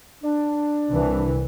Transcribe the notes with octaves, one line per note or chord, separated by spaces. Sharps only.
D4
C2 E3